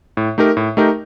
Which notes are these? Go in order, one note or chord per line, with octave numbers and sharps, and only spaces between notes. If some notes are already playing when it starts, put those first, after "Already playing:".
A2
A3 D#4 G4 A#4
A2
A3 D#4 G4 A#4